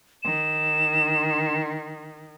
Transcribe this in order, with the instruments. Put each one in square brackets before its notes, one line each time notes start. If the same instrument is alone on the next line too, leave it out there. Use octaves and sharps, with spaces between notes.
[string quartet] D#3 [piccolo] E7